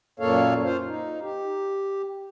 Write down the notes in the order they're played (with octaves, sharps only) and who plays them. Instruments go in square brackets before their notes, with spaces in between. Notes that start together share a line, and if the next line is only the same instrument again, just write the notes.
[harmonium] F#2 A#2 A#3 A4 C#5 F5
F4 C5 F5
D#4
G4